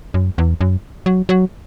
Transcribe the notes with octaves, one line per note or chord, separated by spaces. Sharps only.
F#2
E2
F#2
F#3
F#3